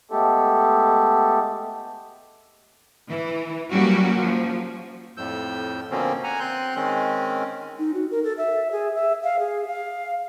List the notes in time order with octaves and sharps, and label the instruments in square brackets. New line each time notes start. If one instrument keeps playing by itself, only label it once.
[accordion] G#3 A3 B3 G4 A4
[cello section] E3
F#3 G3 A#3 C#4 F#4 G4
F3 F#3
[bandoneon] F2 A2 E6 G6
B2 D3 F3 A#3 C4 C#4
F#5 G#5 A#5
C4 C6 F#6 G6
D#3 G#3 C4 C#4
[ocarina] D#4
F#4
A#4
A4
E5
G#4
E5
F5
G#4
F5